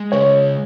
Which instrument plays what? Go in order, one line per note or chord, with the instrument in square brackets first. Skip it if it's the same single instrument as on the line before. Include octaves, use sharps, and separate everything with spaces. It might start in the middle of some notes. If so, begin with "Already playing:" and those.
Already playing: [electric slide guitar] G#3
[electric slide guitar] C#3 [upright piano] C#5